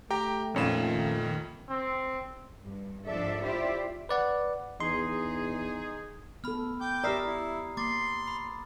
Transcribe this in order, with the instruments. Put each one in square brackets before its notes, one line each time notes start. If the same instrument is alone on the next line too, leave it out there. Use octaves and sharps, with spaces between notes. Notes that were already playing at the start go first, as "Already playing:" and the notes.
[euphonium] A3 [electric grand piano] G4 G5 A#5
[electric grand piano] F2 E7 [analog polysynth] A#2 D#3 [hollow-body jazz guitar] C#4 F4
[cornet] C4
[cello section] G2
G#2 F3 D4 A4 D5 E5
E4 F4 G4 C5 D5 E5
[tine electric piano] B4 D5 F#5
[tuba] E2 [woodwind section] D#4 G#4 [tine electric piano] C6
[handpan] B3 A4 [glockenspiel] B5 F6
[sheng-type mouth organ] G5 D6 G6
[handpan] G4 D5 [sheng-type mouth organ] A#4 E5 [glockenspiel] A#5 D#6 C7
[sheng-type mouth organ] E4
[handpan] A#3 [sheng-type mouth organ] C6 [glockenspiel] D6 A6
[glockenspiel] B5